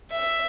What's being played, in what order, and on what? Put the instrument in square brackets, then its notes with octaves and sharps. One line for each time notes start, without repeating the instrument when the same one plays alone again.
[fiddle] E5